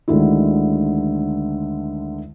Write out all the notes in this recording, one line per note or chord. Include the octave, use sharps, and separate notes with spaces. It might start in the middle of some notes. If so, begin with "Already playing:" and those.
D2 D3 D#3 G#3 E4